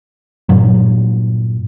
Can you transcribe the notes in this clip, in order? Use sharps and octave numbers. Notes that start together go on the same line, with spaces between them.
G2 A#2 F#3